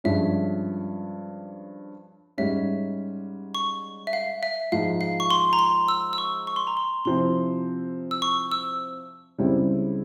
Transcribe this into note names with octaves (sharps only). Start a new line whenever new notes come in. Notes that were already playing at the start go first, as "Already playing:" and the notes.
G2 F3 G#3 C#4 E5
G#2 G3 C#4 E5
C#6
E5
F5
E5
G#2 F3 G#3 F5
F5
C#6
C6
A#5
C6
E6
E6
C#6
C#6
C6
A#5
C6
C3 F3 C4 E4 C6
E6
C#6
E6
C#2 C#3 G3 C4 E4